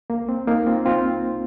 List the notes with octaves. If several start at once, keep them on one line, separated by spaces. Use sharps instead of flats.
C2 A#3
C4
C2 A#3 D#4
C4 F4
C2 C4 F4